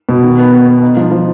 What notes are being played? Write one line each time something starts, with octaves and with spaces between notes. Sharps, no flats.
B2
D#3
B3
B3
B3
D#4
F3
F3